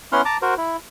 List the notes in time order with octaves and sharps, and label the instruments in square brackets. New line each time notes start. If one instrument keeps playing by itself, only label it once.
[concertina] B3 C#4 E4 F#5 C6 F6
A5 A#5 D6
F#4 A#4 C5
E4